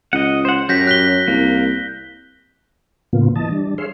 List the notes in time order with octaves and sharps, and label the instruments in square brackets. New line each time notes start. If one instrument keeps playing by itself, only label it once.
[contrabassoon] C#2 [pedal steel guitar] D#5 F#5
[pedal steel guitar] C5 F#5
[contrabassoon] F#2 [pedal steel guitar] C#4 F#4 G4 [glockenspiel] G6 A#6 B6
[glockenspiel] F#6 B6 G7
[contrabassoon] C2 [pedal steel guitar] A#3
[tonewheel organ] A2 C#3 A#3 B3 F4
E3 D#5 A5
G3 D4
G#4 C#5 E5 F5 C6